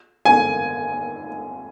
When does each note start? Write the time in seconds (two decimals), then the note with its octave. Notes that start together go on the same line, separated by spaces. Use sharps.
0.25 G#5